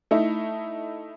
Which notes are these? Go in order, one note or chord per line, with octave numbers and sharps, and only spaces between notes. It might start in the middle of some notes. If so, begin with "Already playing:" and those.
A3 D#4 E4